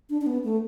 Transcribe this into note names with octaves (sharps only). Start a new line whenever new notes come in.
D4
D4
B3
A3